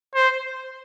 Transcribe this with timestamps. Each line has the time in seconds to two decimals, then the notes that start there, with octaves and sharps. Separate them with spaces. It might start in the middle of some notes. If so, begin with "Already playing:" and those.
0.15 C5